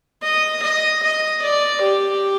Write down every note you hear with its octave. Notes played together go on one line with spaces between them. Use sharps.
D#5
D#5
D#5
D5
G4